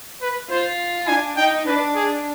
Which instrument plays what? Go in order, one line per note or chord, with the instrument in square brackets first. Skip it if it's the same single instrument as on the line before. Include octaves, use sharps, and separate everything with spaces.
[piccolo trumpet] B4
[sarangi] F4 [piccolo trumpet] C5
[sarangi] D4 [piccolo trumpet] G#5
[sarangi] D#4 [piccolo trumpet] G5
[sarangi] D4 [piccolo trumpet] B4
[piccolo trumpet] G#4